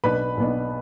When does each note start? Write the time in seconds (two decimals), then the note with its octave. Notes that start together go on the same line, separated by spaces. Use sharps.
0.04 B1 B2 B3 D4 B4 B5
0.38 B1 B2 B3 D4